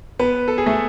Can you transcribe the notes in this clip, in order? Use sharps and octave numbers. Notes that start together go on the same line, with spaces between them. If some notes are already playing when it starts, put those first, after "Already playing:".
B3 B4
A4
G#4
A3 A4